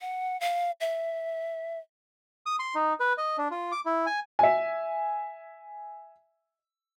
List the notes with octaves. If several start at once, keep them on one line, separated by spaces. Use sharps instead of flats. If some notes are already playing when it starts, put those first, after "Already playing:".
F#5
F5
E5
D#6
C6
D#4
B4
D#5
D4
F4
D6
E4
G#5
E5 G#5